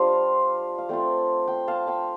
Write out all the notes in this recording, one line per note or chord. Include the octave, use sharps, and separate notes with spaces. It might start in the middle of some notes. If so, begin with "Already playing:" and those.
Already playing: G3 D4 F4 C5 F5
F5
A3 C4 F4 D5 G5
G5 C6
F5 A5
G5 C6